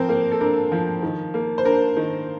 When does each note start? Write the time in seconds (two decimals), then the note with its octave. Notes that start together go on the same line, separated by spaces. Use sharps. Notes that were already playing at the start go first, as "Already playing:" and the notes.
Already playing: F3 C4 A#4 C5
0.09 A#3
0.32 A4
0.41 D4 A#4
0.72 F3
1.03 D#3
1.34 A#3
1.58 C5
1.65 D4 A#4
1.97 D#3